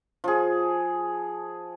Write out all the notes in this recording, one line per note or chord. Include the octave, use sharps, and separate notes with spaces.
F3 G#4